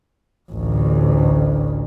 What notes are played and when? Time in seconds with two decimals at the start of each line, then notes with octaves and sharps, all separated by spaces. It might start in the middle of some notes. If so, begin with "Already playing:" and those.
0.52 A1 D2